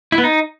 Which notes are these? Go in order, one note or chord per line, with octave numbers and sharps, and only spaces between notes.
E4
B3
D#4